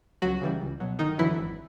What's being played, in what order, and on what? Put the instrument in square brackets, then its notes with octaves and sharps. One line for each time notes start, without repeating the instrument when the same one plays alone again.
[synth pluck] C#2 F#3 F#4
C#3 E3 G3
C#2
B2 F#3
G1 D#3 D#4
F2 D3 E3 F#3 E4
G#1